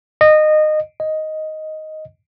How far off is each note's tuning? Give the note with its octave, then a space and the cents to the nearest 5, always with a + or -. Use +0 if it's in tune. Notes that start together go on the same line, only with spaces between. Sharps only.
D#5 -20
D#5 +5